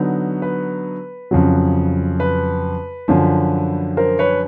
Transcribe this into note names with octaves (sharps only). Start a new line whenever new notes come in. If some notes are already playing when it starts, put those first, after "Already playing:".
Already playing: D3 F#3 B3 D#4
B4
F2 C#3 F#3
B4
F#2 D3 F3
A#4 C5
B4 C#5